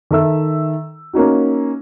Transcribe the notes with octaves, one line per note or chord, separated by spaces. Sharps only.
D#3 A4 E5 E6
A#3 C#4 D#4 F#4